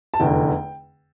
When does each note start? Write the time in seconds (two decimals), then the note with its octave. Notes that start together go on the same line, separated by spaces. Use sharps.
0.14 A5
0.20 F1 E2 D3 G5